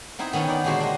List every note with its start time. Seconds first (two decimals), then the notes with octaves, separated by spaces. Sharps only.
0.19 B3 C4 D#4 E4
0.33 D#3 B3 C#4 A4
0.47 D#3 D#4 D5
0.64 A#2 D3 G#3 F#4 G4 C5
0.80 D4 D#5